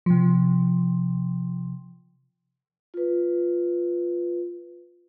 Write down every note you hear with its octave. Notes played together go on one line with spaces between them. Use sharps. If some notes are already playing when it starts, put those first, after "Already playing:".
C3 F3
F4 B4